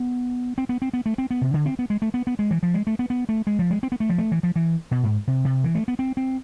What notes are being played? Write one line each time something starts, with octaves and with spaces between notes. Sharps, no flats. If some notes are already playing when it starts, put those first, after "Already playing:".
Already playing: B3
C4
B3
C4
B3
A3
C4
B3
C3
D3
C4
B3
G#3
A3
B3
B3
G#3
E3
F3
G#3
A3
B3
B3
A3
G#3
F3
G#3
C4
B3
A3
F3
A3
E3
F3
E3
B2
G#2
C3
C3
E3
A3
B3
C4
C4